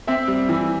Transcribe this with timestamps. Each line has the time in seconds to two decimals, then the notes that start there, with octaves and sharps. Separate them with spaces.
0.07 C4 E5
0.28 G3
0.49 E3